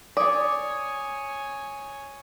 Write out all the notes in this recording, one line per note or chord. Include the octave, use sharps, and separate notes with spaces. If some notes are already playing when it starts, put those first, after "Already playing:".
C#5 D5 G#5 D#6